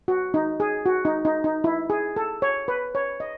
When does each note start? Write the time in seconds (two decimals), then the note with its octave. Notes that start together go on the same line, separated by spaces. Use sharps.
0.08 F#4
0.34 D#4
0.60 G#4
0.86 F#4
1.05 D#4
1.25 D#4
1.44 D#4
1.64 E4
1.90 G#4
2.16 A4
2.42 C#5
2.68 B4
2.95 C#5
3.20 D#5